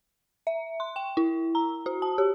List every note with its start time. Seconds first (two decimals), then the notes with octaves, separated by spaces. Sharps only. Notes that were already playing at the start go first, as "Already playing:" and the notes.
0.47 E5
0.80 C6
0.96 G5
1.17 E4
1.55 A#5
1.86 F#4
2.02 A5
2.18 G4